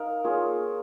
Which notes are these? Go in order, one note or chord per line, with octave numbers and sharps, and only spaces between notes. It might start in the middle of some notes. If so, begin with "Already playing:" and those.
Already playing: D#4 A#4 F5
A#3 F4 G#4 C#5